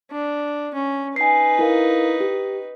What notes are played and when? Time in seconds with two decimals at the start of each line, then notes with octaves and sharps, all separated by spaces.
0.11 D4
0.74 C#4
1.16 D#4 B4 G#5 C7
1.59 E4 A#4 F5
2.20 G4